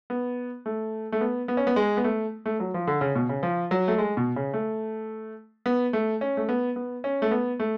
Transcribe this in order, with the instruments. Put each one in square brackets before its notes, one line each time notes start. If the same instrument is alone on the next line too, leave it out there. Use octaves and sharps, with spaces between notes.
[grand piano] B3
A3
A3
B3
B3
C#4
B3
G#3
B3
A3
A3
F#3
F3
D3
C#3
B2
C#3
F3
F#3
A3
G#3
B2
C#3
A3
B3
A3
C#4
A3
B3
B3
C#4
A3
B3
A3